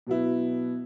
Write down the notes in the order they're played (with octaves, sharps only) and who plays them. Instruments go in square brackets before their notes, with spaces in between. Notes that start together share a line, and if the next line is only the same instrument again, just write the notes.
[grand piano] B2 F#3 B3 E4